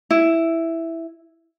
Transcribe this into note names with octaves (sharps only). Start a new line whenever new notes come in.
E4